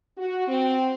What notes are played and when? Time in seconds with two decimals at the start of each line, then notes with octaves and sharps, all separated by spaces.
0.18 F#4
0.48 C4